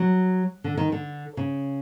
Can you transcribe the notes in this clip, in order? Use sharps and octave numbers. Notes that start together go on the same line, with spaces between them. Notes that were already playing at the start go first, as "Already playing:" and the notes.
Already playing: F#3
D3
D#3
D3
C#3